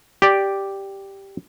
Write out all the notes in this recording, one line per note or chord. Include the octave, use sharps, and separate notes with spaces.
G4 D5